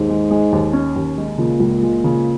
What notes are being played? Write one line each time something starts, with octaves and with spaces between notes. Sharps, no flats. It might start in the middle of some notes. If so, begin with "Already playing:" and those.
Already playing: D#2 G#2
G#3
G#3
D#2
C#4
D#2
G#3
A#2 C#3
C#2
G#3
C#3